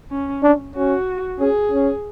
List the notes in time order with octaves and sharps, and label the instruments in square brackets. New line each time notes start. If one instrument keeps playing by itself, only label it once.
[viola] C#4
[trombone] D4
[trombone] C#4 [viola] F#4
[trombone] C#4 [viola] G#4
[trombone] C#4